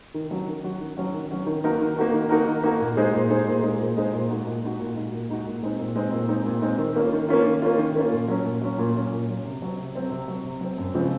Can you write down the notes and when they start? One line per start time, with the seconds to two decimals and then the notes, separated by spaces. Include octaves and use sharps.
0.14 D#3
0.31 F#3 C#4 F#4
0.47 D#3
0.64 F#3 C#4 F#4
0.80 D#3
0.97 F#3 C#4 F#4
1.14 D#3
1.31 F#3 C#4 F#4
1.46 D#3
1.64 A#3 D#4 F#4 A#4
1.80 D#3
1.96 A#3 D#4 F#4 A#4
2.13 D#3
2.29 A#3 D#4 F#4 A#4
2.47 D#3
2.63 A#3 D#4 F#4 A#4
2.80 A#2
2.97 G#3 D#4 G#4 C5
3.13 A#2
3.30 G#3 D#4 G#4 C5
3.47 A#2
3.62 G#3 D#4 G#4 C5
3.80 A#2
3.97 G#3 D#4 G#4 C5
4.13 A#2
4.30 G#3 D#4 F#4
4.46 A#2
4.62 G#3 D#4 F#4
4.80 A#2
4.96 G#3 D#4 F#4
5.13 A#2
5.30 G#3 D#4 F#4
5.46 A#2
5.63 G#3 C4 D#4
5.80 A#2
5.95 G#3 C4 D#4
6.12 A#2
6.29 G#3 C4 D#4
6.46 A#2
6.62 G#3 C4 D#4
6.78 D#3
6.96 A#3 C#4 F4
7.13 D#3
7.29 A#3 C#4 F4
7.45 D#3
7.62 A#3 C#4 F4
7.78 D#3
7.95 A#3 C#4 F4
8.12 A#2
8.28 F#3 C#4
8.45 A#2
8.61 F#3 C#4
8.78 A#2
8.96 F#3 C#4
9.12 A#2
9.28 F#3 C#4
9.45 C3
9.62 F#3 C4
9.78 C3
9.95 F#3 C4
10.11 C3
10.28 F#3 C4
10.44 C3
10.61 F#3 C4
10.78 F#2
10.94 C#3 F3 G#3 C4